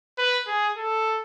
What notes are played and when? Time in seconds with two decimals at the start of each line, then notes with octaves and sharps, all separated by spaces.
0.18 B4
0.47 G#4
0.77 A4